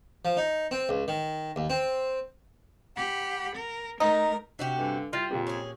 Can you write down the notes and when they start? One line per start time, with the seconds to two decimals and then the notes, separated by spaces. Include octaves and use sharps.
0.25 F3
0.37 D#4
0.71 C4
0.89 C#2
1.08 D#3
1.56 D#2
1.70 C4
2.96 G4 F#5 B5
3.55 A#4
4.00 A3 D#4 A#4
4.59 C3 D4 F#4 G4
4.78 G2 D3 G#5
5.13 G3 E4 F4 A#6
5.31 F2 A#2 A#3 G4
5.47 C#4 G#4